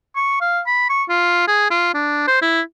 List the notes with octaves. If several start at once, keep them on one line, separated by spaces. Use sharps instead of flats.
C#6
F5
B5
C#6
F4
G#4
F4
D4
C5
E4